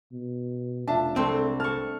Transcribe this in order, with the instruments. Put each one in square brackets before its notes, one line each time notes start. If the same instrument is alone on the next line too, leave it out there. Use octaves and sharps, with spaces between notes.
[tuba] B2
[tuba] F1 [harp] D4 [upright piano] F4 E5 A5
[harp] C2 A3 [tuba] G#3 [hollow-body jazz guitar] C4 [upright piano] A5 C6
[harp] A5 C#6 [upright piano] F6